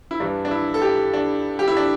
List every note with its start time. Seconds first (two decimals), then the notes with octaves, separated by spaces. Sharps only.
0.11 E4
0.20 G2 E3 D4
0.45 D4
0.51 E4
0.74 A4
0.82 G4
1.14 D4
1.59 G4
1.68 E4
1.77 D4